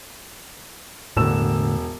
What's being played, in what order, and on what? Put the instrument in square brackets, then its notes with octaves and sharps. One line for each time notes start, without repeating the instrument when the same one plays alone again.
[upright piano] E1 E6 E7 [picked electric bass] A2 D3